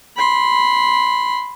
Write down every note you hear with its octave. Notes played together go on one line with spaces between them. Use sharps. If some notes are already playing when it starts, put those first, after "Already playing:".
B5 C6